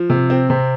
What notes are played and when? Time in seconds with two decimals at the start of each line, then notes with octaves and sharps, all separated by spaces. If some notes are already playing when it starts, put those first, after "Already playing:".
Already playing: F3
0.10 C3
0.30 C4
0.50 C3